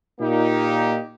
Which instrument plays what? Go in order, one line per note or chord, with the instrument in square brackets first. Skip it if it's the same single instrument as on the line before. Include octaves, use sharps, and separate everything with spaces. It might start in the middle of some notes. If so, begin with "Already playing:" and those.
[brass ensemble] A#2 A#3 D#4 G4